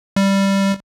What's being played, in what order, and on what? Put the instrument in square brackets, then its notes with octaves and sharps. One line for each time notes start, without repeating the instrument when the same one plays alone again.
[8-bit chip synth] G3